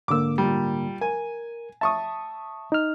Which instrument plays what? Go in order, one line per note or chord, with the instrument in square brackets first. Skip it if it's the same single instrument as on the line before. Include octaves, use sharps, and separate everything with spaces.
[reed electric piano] G#2 D3 A#3 [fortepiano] D6 E6
[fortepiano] A#2 G3
[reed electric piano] A#4 [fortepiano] G#5
[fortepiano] E5 C#6 D#6 [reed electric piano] A5
[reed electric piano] D#4 F6